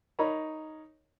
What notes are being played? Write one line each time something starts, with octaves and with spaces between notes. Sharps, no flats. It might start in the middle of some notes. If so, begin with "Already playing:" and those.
D#4 A#4 C#5 A#5 B5